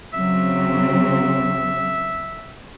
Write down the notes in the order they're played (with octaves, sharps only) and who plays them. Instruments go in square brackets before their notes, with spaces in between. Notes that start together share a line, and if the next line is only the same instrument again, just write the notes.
[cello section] C#3 F#3 C4 [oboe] E5